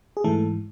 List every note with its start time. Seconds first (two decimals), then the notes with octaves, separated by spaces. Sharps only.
0.17 G#4
0.24 G#2 E3 A3 A4